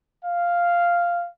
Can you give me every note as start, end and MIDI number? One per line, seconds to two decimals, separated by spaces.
0.25 1.27 77